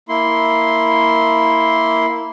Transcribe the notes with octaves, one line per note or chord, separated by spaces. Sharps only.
A#3 E4 C6